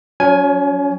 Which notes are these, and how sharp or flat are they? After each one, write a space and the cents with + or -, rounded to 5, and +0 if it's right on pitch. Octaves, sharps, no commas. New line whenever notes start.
F#3 -20 C#4 +35 G#5 +0